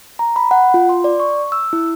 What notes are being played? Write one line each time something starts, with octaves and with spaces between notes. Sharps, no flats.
A#5
B5
F#5
F4
C6
D5
C#6
E6
E4